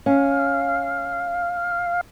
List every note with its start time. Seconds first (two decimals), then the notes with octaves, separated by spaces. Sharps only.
0.06 C#4 F5